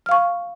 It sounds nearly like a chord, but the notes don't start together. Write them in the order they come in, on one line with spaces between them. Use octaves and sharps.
F6 F5 C#6